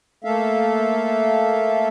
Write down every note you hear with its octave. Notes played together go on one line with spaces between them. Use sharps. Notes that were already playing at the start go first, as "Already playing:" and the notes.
A3 A#3 A4 E5 F5